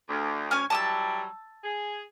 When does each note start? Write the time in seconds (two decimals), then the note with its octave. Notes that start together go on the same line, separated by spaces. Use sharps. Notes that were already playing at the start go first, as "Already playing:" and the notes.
0.09 D2
0.51 C#4 G#5 F6
0.70 E3 F#3 G3 A5 D#6 E6
1.63 G#4